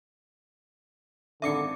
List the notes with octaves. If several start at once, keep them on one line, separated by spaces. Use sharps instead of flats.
G#1 F#2 D3 E5 D6 C#7